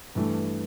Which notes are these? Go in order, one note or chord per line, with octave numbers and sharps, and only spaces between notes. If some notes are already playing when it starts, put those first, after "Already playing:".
G2 E3 A3